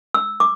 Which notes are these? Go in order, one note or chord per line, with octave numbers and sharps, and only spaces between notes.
E6
D6